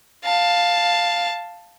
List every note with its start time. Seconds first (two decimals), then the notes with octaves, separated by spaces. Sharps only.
0.25 F5 A5